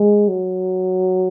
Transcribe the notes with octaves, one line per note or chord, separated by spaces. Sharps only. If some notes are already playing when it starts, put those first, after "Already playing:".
Already playing: G#3
F#3